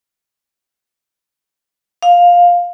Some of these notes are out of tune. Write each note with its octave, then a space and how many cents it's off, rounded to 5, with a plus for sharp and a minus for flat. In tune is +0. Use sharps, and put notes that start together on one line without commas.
F5 +10